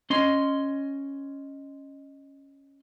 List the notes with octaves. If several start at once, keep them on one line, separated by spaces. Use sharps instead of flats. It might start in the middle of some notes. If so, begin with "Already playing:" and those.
C#4 D#5 C6